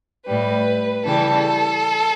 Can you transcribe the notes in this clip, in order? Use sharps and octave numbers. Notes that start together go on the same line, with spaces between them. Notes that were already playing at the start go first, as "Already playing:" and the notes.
A2 G3 B4
C#3 E3 G3 A4